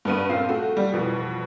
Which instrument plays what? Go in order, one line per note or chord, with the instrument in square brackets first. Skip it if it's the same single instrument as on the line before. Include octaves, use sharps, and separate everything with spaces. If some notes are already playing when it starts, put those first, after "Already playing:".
[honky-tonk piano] G2 B3 D#7
A#2 C4 F5
A3 F#4
G3
F2 B2 E3